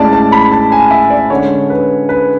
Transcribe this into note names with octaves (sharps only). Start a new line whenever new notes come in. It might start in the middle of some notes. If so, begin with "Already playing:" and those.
Already playing: A2 G#3 C#4 E4 D5 A5
A5
B5
A5
G#5
E5
D5
D3 G#3 C#4 C#5
B4
B4